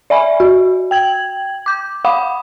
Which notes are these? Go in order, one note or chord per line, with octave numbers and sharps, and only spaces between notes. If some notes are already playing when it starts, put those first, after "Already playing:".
D5 E5 G#5 B5
F#4
G5 G#6 F#7
D6 G6
F5 F#5 B5 D6 D#6